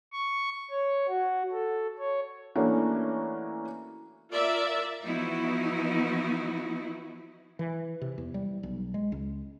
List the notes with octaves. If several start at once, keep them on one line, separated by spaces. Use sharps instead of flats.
C#6
C#5
F#4
A4
C#5
E3 A3 A#3 C#4 D4 F#4
F4 A#4 D5 E5
E3 F3 B3 D#4 E4 F#4
E3
C3
E2
G3
B1
G#3
C#2